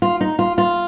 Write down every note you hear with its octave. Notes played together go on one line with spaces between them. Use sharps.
F4
D#4
F4
F4